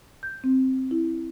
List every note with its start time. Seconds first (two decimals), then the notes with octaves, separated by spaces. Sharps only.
0.23 G6
0.44 C4
0.91 E4